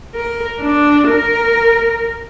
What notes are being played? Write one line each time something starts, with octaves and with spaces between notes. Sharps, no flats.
A#4
D4
A#4